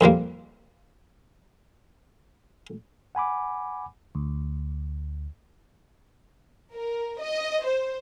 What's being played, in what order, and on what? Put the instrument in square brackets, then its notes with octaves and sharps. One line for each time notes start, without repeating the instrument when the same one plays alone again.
[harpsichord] F2 D#3 G3 A#3
[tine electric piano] F#5 G#5 B5 D6
[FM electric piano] D2
[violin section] A#4
D#5
C5